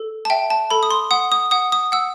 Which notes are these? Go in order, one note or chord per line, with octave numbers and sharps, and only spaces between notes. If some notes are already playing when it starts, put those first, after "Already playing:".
Already playing: A4
A5
E5 G5
A5
A4 B5
D#6
C6
F#5 D#6
D#6
F#5 D#6
D#6
F#5 E6